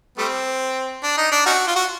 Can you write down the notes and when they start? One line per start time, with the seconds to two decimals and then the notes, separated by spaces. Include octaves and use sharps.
0.18 G3 A3 C4
1.03 D4
1.18 D#4
1.32 D4
1.46 C#4 D#4 F#4
1.68 F4
1.76 F#4